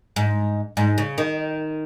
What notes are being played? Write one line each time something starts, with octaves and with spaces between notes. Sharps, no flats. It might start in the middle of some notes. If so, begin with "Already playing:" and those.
G#2
G#2
C#3
D#3